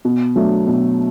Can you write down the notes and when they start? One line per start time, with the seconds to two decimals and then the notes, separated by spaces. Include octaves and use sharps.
0.05 B2
0.36 F#3 A3 D4
0.67 B2